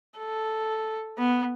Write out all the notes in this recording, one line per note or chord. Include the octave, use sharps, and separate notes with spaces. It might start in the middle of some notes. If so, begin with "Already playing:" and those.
A4
B3